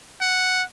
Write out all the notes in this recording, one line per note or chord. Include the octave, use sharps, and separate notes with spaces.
F#5